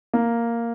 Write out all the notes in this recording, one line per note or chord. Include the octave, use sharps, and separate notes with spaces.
A#3